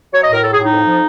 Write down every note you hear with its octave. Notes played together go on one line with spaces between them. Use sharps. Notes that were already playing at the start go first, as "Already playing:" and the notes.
F#3 C#5
D#5
A2 A#4
F#3 A4
G#4
A2
D#4
F2
F3